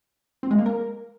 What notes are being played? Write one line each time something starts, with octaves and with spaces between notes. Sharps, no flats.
C4
G#3
A#3
A#4